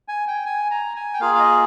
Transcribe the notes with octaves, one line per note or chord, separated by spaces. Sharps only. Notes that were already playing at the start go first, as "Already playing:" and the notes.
G#5
G5
G#5
A#5
G#5
G5
A#3 F4 G#4 F5
F5
D#5